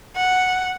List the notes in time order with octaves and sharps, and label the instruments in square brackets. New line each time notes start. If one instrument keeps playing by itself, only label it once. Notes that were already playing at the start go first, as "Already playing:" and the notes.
[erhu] F#5